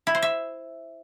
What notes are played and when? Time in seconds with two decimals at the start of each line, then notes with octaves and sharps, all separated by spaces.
0.07 E4
0.15 C5
0.22 E5